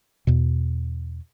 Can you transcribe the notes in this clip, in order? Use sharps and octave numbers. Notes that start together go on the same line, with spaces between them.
E2 B2